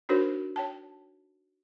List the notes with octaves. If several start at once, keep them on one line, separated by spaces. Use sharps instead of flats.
D4 D#4 F#4 A#4 C5 C#5
C#5 G5 A5